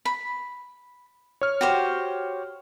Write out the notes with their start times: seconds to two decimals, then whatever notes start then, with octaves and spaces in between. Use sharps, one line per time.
0.05 B5
1.41 C#5 F6
1.61 F#4 G4 C5